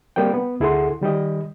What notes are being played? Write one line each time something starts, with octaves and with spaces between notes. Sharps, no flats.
G3 A#3 C4 G5
B3
D2 E4 G#4 A4 F#5 C6
D#3 G3 G4 D#5